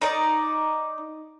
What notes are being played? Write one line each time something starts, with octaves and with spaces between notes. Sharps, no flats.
D#4 D5